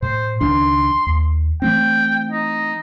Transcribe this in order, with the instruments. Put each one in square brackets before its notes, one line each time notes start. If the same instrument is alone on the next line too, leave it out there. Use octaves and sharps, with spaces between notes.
[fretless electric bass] A2 [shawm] C5
[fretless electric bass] C#2 D#3 D4 [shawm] C6
[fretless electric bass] D#2
[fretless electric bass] E3 A3 C4 [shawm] G5
[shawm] D#4